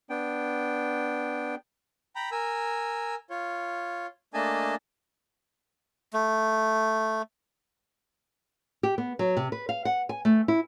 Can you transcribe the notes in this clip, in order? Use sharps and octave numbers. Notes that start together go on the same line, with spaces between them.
B3 D4 G5
G5 A#5 B5
A#4 G#5 E6
F4 C#5
A3 A#3 D4 D#5 G#5 A5
A3
G4
B3
F#3
C3
B4
F5
F#5
G#5
A3
E4